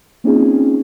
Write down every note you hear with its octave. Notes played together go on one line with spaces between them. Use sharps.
A#3 C4 C#4 D#4 F4 G#4